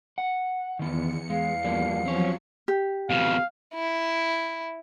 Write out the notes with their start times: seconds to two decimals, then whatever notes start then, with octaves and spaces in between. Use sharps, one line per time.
0.18 F#5
0.79 E2 D#3 B3 C#7
1.30 G#3 F5
1.64 F3 G3 A#3
2.05 F3 F#3 C4 C#5
2.68 G4
3.10 F2 B2 F5
3.75 E4